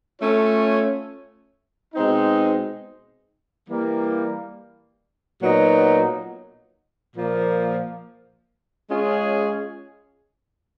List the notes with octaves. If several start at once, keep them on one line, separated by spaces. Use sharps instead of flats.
A3 C#4 F4 A4 C#5
B2 G#3 C4 D#4
E3 G3 A#3
A#2 F#3 B3 D#4
A#2 F3 A#3
G#3 C#4 F4 G#4 C#5